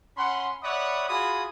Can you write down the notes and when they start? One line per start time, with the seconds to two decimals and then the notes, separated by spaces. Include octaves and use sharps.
0.17 C#4 F#5 B5 C6
0.63 C#5 D5 E5 F#5 B5 D#6
1.09 F4 F#4 G#4 G#5 B5 D#6